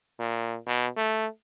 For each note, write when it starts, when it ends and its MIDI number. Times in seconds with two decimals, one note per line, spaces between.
0.19 0.57 46
0.67 0.87 47
0.96 1.27 57